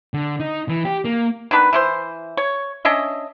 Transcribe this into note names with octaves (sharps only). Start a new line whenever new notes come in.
D3
D#4
E3
G4
A#3
D#3 B3 D4 B4
E3 E4 C5
C#5
C#4 D4 D#5 E5